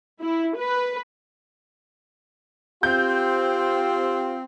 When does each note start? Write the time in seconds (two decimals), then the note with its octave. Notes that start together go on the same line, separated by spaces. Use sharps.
0.22 E4
0.58 B4
2.83 C4 F4 G4 G6